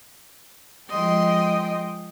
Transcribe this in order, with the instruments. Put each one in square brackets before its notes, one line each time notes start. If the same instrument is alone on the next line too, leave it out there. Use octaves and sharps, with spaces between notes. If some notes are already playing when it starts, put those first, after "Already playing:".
[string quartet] F3 G#3 D#5 G5 C6